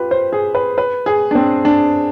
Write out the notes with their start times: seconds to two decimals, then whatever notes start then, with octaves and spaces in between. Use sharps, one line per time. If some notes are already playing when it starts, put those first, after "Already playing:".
Already playing: F4 G4 B4
0.11 C5
0.33 G#4
0.55 B4
0.78 B4
1.06 G#4
1.31 D4
1.35 C4
1.65 D4